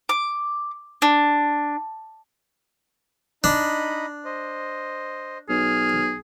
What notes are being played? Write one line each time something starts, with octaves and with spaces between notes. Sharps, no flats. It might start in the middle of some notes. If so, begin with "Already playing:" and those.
D6
D4
D4 D#4 D#5 B5
C5 D#5
B1 G#4 F6